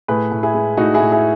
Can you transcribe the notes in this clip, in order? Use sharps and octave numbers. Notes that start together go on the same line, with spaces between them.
A2 G#4 B4
A2
E4 G#4
G#3
A2 D#4 F#4
E4 G#4
A2
E4 G#4